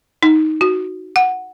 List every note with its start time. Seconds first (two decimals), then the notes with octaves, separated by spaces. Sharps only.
0.23 D#4
0.61 F#4
1.16 F#5